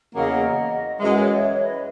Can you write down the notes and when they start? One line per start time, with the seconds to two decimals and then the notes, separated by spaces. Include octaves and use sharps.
0.14 E2 C#3 F#3 A#3 D#5 F#5
0.99 F#2 E3 G#3 E5
1.09 F#5
1.19 C#5 E5
1.41 C#5 E5
1.62 B4 D#5